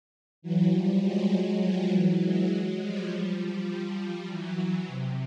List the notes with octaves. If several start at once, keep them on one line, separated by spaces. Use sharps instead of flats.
E3 F#3
F3 G3
F#3 G#3
F3 G3
E3 F#3
F#3 G#3
F3 G3
F3 G3
E3 F#3
C3